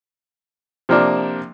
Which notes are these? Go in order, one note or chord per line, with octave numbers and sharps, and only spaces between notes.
C3 F3 A#3 D4